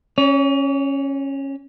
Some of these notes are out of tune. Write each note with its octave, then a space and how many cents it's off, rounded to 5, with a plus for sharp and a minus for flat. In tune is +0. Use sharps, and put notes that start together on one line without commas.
C#4 -15 C#5 +40